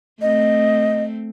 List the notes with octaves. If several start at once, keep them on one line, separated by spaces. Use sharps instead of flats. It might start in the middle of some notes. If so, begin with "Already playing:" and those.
A3 C4 D#5